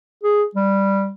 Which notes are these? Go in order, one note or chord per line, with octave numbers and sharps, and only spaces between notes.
G#4
G3